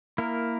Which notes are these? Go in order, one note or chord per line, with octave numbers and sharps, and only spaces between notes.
A#3 E4 A#4